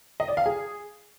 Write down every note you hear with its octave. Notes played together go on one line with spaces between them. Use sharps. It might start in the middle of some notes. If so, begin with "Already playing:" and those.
D#5
D5
F5
G#4